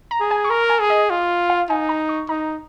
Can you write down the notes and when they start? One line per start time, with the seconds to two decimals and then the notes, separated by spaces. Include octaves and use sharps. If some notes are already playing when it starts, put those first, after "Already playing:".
0.11 A#5
0.20 G#4
0.31 G#5
0.44 C#6
0.50 A#4 A#5
0.70 G#5
0.80 G#4
0.90 D#5
1.10 F4
1.50 F5
1.69 D#4 G#5
1.89 A#5
2.09 C#6
2.29 D#4 A#5